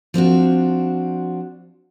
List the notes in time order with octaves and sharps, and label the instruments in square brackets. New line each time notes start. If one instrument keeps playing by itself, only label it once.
[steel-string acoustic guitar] F3 C4 D4 F#4